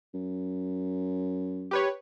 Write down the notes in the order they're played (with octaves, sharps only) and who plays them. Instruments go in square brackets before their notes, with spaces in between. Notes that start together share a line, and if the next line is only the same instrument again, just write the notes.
[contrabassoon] F#2
[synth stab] G4 B4 C#5